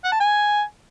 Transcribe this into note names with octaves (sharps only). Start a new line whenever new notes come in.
F#5
A5
G#5